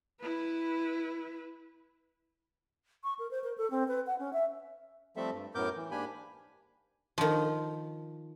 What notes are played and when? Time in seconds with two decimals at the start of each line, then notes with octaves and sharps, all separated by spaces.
0.21 E4 B4
3.04 C#6
3.19 A#4
3.31 C5
3.44 A#4
3.58 A4
3.71 C4
3.88 B4
4.07 F#5
4.19 C#4
4.33 E5
5.16 F3 G3 A3 C4 A4 E5
5.33 G2
5.55 F#2 A2 B3 A#4 D6 G6
5.76 E3
5.91 G#2 A#3 D4 G4 G#5 B5
7.18 D#3 F3